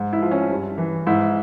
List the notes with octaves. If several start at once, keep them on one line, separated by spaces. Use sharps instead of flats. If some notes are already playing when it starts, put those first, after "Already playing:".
Already playing: G#2
E4
F3
C#4
G2
E3
G#2 E4